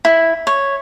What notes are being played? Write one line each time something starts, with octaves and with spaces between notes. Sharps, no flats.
E4
C#5